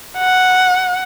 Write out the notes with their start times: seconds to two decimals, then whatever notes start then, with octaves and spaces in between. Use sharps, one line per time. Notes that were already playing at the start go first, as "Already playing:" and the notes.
0.18 F#5